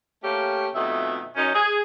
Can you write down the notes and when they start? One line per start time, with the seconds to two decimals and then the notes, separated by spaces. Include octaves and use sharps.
0.23 A3 A#3 C#4 G4
0.75 F2 B2 D#3 A3 E5
1.36 F#2 C#4 D#4
1.55 G#4